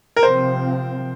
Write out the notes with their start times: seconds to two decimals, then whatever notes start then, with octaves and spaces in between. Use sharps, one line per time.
0.16 A#4
0.23 C3 F3 C4 C5